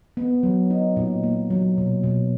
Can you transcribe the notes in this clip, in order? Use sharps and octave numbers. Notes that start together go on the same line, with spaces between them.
B3
F#3
D#4
A#2
A#3
F#3
B2
B2